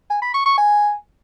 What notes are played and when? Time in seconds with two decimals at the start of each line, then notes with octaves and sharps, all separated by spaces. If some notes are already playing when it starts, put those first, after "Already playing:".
0.10 G#5
0.22 B5
0.34 C#6
0.46 C#6
0.57 G#5